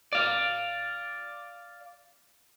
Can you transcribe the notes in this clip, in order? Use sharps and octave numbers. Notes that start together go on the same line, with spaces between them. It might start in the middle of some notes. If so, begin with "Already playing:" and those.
D5 F5